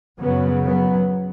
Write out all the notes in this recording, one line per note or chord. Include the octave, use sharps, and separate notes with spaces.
F#2 C#3 F#3 B3
F#3 B3